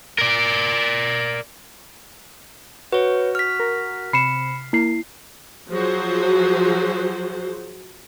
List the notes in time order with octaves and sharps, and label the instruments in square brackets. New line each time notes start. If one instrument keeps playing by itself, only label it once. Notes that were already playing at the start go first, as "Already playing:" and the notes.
[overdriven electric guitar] A#4 D5
[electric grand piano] F#4 [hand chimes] B4 C#5
[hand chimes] F6 B6
[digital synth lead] A#4
[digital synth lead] C3 [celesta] B5 C#7 E7 [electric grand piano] C7
[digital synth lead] A#3 [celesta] E4 C7
[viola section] F3 F#3 F#4 G#4 C5